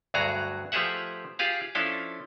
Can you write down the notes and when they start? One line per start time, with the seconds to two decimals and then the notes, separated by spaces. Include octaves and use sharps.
0.14 D2 G2 F#3 F#4 G#4 A#5
0.72 F3 A3 G4 G#4 E5 F#5
1.39 F4 G4 G#4 F5
1.75 F3 C#4 D4 E4 A4 F5